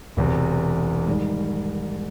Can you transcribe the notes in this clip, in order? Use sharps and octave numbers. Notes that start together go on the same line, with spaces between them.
E1 E2 C3
G#2 D#3 G3